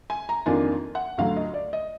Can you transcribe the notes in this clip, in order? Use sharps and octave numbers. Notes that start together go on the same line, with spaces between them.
G#5
A#5
F2 D#3 A#3 D4 F4 G#5
F#5
D2 D3 F#3 F5
D#5
D5
D#5